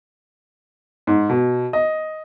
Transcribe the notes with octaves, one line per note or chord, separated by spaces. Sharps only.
G#2
B2
D#5